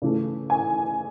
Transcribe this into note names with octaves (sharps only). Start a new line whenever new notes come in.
C#3 E3 A3
G#5